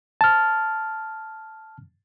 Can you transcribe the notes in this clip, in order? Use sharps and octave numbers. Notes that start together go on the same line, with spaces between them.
A5 F6